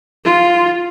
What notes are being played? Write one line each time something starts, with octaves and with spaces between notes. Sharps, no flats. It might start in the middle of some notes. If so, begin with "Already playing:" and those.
F4